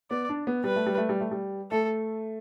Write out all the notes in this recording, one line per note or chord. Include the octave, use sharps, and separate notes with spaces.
B3 D5
D4
B3
G3 B4
A3
G3
A3
G3
A3
G3
A3 A4